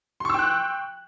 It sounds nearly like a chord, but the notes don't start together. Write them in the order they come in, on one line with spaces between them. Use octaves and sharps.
C6 C#6 E6 G5 F#6